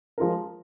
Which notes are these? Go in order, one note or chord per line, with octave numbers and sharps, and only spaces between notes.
F3 G#3 F4 A#4